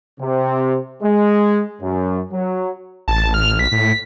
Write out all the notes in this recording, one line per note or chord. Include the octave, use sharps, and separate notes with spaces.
C3
G#3
F#2
F#3
A1 A5
F6
B1 B6
A2